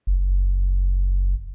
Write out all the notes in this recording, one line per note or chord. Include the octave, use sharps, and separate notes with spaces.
F#1